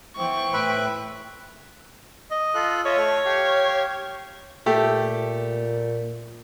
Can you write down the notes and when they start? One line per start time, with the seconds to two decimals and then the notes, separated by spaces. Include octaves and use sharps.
0.17 E3 B3 C5 G5 C#6
0.53 A2 B4 E5 B5
2.31 D#5
2.55 F4 A4 F#6
2.85 F4 C#5 D#5 E5
2.97 A3 F6
3.25 G4 F5
4.66 A#2 A3 G4